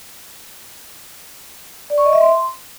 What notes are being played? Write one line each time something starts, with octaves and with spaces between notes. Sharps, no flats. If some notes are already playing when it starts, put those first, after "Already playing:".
D5
C#6
D#5
E5
C6